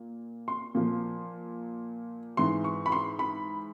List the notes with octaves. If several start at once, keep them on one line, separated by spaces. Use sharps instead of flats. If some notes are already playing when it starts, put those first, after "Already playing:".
Already playing: A#2
C6
A#2 F3
G#2 E3 C6
C#6
B5
C6
B5